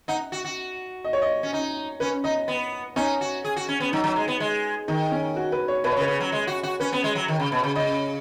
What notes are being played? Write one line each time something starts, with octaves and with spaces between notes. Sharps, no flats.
D#4 F#5
F#4
F#4
D#5
C#5
D#5
C#4
D#4
C#4 B4
D#4 D#5
B3
C#4 D#4
F#4
G#4
F#4
C#4
B3
F#3 D#4
F#3
G#3
B3
G#3
D#3 D#4
C#4
F#4
B4
C#5
B2 B4
C#5
C#3
B4
C#3
F#3
G#3
F#4
F#4
C#4 B4
B3
G#3
F#3
D#3
C#3
B2
C#3
C#3 D#5